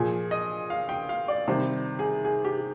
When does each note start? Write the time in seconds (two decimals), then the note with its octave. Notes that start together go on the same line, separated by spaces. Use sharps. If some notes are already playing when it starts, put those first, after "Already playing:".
Already playing: A#2 F3 G#4
0.31 D#5
0.70 F5
0.89 G5
1.09 F5
1.28 D5
1.48 C3 D#3 G3 C5
1.99 G#4
2.25 G#4
2.45 G4